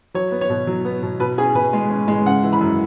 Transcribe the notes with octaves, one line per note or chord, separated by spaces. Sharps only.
F#3 C#5
B3
C#5
B2
F#3
B3
B2
B2 B4
C#4 G#4
B2 B4
G#3
C#4
G#3
C#3 F#5
E3
B5
F#2